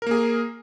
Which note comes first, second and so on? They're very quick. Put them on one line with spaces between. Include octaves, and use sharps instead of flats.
A#4 A#3 G#4